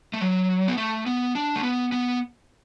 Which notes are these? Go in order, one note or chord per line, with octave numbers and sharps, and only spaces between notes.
A3
F#3
B3
A3
B3
D4
A3
B3
B3